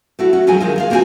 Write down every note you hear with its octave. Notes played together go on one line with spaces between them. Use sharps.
A3 E4 F#4
C#4 F#4
D2 F3 F#3 G#3 C4 G#5
D3 D#3 G#3 F4
G#3 F4 F5
D2 A#3 C4 D4 F#4 G#5